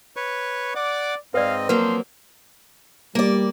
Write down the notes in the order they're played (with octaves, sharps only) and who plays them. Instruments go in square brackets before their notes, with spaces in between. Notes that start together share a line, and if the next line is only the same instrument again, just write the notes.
[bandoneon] B4 C#5 C#6
[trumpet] D5 [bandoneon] F#5 D6
[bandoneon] G#2 C4 D#5 [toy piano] B4 D5 [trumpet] F5
[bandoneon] F3 [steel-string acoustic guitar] F#3 A#3 C4 [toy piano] B4 [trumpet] C6
[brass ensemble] G3 [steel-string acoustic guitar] A#3 D5